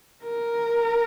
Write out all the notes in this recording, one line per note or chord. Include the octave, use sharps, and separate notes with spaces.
A#4